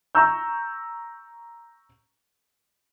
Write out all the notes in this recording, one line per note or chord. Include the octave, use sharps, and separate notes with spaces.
A#5 C#6 E6 G6